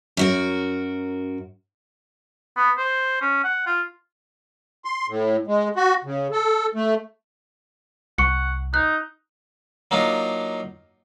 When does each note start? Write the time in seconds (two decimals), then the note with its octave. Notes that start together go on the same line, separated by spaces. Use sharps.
0.17 F#2 F#4 A#4
2.57 B3
2.78 C5
3.22 C#4
3.44 F#5
3.67 F4
4.85 C6
5.08 A2
5.47 G#3
5.76 F#4
6.04 C#3
6.32 A4
6.75 A3
8.18 C2 F#5 C#6 C#7
8.74 D#4 F#6
9.91 F#3 A#3 D4 D#4 F4